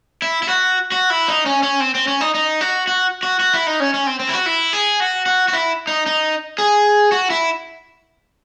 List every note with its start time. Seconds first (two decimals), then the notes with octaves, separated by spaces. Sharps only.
0.22 E4
0.43 E4
0.49 F#4
0.92 F#4
1.10 E4
1.28 D#4
1.46 C#4
1.63 C#4
1.80 C4
1.95 C4
2.08 C#4
2.21 D#4
2.35 D#4
2.61 F#4
2.87 F#4
3.23 F#4
3.40 F#4
3.54 E4
3.67 D#4
3.80 C#4
3.94 C#4
4.07 C4
4.19 C4
4.29 E4
4.34 F#4
4.46 E4
4.73 G#4
5.00 F#4
5.26 F#4
5.48 F#4
5.53 E4
5.87 D#4
6.06 D#4
6.58 G#4
7.12 F#4
7.30 E4